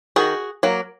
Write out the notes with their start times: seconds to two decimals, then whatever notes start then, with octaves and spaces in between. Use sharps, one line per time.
0.16 D#3 F#4 G#4
0.63 F#3 A#3